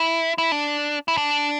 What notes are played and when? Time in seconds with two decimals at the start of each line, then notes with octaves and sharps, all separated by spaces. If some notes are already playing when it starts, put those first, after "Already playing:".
Already playing: E4
0.38 E4
0.52 D4
1.08 E4
1.17 D4